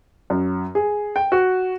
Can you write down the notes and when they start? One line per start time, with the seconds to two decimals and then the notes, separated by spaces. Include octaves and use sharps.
0.30 F#2
0.75 G#4
1.16 G5
1.32 F#4